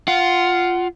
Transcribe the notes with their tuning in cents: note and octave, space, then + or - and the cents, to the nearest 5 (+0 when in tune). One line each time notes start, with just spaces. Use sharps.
F4 +0 F#5 +15